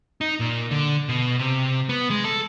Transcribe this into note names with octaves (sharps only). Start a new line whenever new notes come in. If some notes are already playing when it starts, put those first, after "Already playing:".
D#4
A#2
D3
B2
C3
B3
G#3
A4